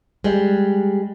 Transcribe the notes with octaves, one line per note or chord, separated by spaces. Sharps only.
G3 G#3